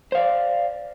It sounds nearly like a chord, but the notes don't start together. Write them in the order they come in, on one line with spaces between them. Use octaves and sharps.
C5 F5 D5